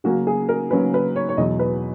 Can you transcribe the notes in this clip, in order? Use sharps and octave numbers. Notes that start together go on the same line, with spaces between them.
C#3 F#3 A#3 C#4 F#4
G#4
A#4
C#3 F#3 A#3 C#4 B4
B4
C#5
C#5
E2 B2 F#3 D#5
B4